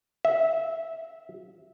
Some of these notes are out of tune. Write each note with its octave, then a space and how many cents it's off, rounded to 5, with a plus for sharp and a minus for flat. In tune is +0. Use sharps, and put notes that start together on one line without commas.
E5 -15